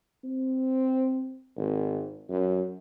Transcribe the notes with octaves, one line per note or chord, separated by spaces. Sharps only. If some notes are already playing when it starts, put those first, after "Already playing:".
C4
G#1
F#2